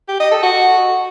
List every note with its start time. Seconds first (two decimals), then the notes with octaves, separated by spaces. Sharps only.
0.08 G4
0.20 D#5
0.31 A4
0.43 F#4